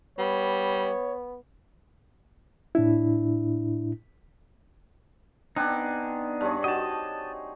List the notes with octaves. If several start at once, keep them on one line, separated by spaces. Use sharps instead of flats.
G3 B3 C#5
A2 D4 E4
B3 C4 D4 D#4 G#5
G2 D4 G#4 C#5
D#4 F#4 G#4 D#5 A5